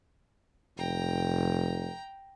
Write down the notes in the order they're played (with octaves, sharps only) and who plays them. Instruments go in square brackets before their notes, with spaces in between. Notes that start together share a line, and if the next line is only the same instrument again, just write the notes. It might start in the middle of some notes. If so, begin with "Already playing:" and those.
[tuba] F1 [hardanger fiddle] G5 A#5